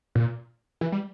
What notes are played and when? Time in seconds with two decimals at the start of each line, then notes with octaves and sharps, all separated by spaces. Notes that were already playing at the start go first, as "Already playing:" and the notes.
0.15 A#2
0.81 E3
0.92 G3